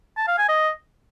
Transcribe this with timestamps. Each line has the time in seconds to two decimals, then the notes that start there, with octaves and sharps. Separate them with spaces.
0.17 A5
0.27 F5
0.38 G#5
0.48 D#5